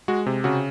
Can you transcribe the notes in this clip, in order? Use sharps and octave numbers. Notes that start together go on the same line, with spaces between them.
G#3 F#4
C3
C#3 F#4